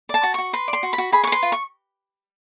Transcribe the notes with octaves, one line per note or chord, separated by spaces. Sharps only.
D5 A5
F#4
F#4 C#6
B4 C6
D5
C6
F#4
B5
F#4
G#4 B5
C#6
B4 C6
F4
C#6